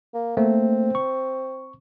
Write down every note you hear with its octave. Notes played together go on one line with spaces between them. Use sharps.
A#3
A3 A#3 C4
C#6